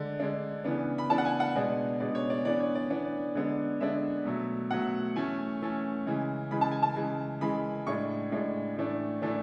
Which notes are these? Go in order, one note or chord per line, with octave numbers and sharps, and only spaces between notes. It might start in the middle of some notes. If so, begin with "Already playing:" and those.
Already playing: D3 G#3 D4
D3 G#3 D4
C#3 E3 B3 D4
B5
C#3 E3 B3 D4 A5
F#5
G#5
F#5
B2 G#3 B3 D4 G#5
B2 G#3 B3 D4 D5
C#5
D5
E3 B3 D4 D5
C#5
D5
E3 B3 D4
D3 G#3 B3 D4
D3 G#3 B3 D4 E5
B2 F#3 A3
B2 F#3 A3 F#5
E3 A3 C#4 G#5
E3 A3 C#4
C#3 E3 G#3
C#3 E3 G#3 B5
A5
G#5
A5
C#3 E3 G#3
C#3 E3 G#3 B5
A2 G#3 D4 C#6
A2 G#3 D4
A2 E3 A3 D4
A2 E3 A3 D4